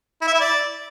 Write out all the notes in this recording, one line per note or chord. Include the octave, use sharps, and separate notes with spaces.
E4
E5
E4
D5